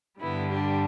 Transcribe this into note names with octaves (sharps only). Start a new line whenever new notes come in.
G2 D3 G3 B3 E4
D4 G4